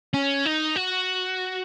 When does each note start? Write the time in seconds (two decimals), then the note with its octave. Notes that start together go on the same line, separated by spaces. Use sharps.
0.14 C#4
0.46 D#4
0.76 F#4